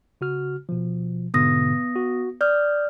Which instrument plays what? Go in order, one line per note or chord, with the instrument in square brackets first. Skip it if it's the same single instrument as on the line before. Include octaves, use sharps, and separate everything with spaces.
[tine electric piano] C#3 F#4 F6
B2 F3
[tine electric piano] G#2 B2 D3 [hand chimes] B3 D#6 A#6
[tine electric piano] F#4
[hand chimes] D5 F6 [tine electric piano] D#6 G6